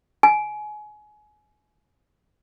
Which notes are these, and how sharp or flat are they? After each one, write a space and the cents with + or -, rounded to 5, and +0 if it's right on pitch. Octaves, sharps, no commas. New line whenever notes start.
G#5 +25